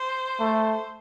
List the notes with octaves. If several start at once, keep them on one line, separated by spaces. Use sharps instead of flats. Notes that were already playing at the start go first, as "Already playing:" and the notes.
Already playing: C5
A3